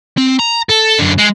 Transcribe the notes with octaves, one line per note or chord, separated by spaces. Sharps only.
C4
A#5
A4
F#2 D3
G#3